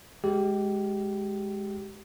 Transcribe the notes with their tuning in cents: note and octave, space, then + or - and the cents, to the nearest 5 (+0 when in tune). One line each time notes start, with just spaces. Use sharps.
G#3 +0 G4 -25